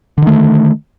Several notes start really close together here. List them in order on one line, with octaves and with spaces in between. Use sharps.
D3 D#3 A3